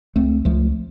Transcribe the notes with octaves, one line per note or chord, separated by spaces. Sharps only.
C#2 A3 C4
C#2 F3 A3